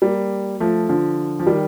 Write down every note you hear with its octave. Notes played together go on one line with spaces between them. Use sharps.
G3 A#3
F3 A3
D3 F3
F3
D#3 G3